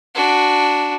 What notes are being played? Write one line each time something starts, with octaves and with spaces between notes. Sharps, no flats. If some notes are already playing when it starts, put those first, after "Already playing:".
D4 F#4